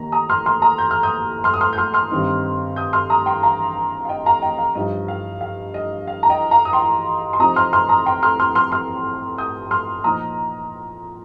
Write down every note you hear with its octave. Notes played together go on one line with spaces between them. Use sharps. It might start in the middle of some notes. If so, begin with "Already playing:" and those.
Already playing: D#2 D#3 A#3 D#4 A#5
A#5 D#6
C6 F6
C6 F6
A#5 D#6
G6
F6
D#6 G6
C6 F6
D#6
C6 F6
G6
C6 F6
C6 F6
G2 D#3 C4 D#4
D#6 G6
C6 F6
A#5 D#6
G5 C6
F5 A#5
F5
D#5 G5
F5 A#5
D#5 G5
F5
G2 F3 D#4 D#5
F5
F5
D#5
F5
A#5
D#5 G5
F5 A#5
D#6
G5 C6
C6
C3 F3 C4 D#4 A#5 D#6
C6 F6
C6 F6
A#5 D#6
G5 C6
C6 F6
C6 F6
C6 F6
C6 F6
D#6 G6
C6 F6
A#2 F3 D#4 A#5 D#6